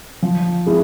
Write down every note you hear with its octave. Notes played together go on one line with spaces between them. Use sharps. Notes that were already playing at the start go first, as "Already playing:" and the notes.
F3
G#3 C4 E4 G#4